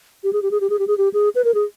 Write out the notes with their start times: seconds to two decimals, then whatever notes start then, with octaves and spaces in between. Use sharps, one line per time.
0.24 G4
0.33 G#4
0.42 G4
0.51 G#4
0.61 G4
0.70 G#4
0.79 G4
0.87 G#4
0.98 G4
1.14 G#4
1.35 B4
1.44 A#4
1.54 G#4